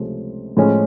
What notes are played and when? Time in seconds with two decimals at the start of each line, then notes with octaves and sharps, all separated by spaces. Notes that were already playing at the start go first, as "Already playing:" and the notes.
Already playing: C#2 C3 F3 A3 C#4
0.57 A2 F3 G#3 C#4